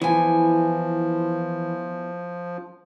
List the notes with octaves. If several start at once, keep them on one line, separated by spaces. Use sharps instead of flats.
E2 E3 F3 G#5